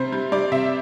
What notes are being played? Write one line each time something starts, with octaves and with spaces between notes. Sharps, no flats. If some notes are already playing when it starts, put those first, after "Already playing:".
Already playing: C3 G3 C4
G3
G3 D5
C3 E5